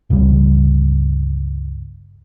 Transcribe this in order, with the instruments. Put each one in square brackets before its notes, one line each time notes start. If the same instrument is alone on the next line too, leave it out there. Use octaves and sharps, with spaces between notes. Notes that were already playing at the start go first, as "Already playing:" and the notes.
[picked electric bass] G1 C#2 C#3 G3